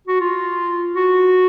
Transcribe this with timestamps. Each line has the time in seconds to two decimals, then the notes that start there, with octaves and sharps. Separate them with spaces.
0.07 F#4
0.20 F4
0.95 F#4